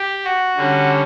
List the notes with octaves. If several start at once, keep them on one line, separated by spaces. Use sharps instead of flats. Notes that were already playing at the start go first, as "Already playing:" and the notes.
Already playing: G4
F#4
D3 G3 C#4